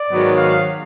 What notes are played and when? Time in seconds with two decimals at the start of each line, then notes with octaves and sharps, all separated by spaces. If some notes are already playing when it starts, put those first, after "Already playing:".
Already playing: D5
0.09 G#2 D#3 F#3 B3
0.37 F5